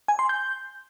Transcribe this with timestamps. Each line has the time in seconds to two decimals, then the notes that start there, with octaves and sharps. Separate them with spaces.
0.08 G#5
0.19 C6
0.29 G6